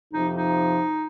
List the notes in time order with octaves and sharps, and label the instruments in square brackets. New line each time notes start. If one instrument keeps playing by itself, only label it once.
[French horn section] F2 C3 F3 [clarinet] D#4
[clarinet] D#4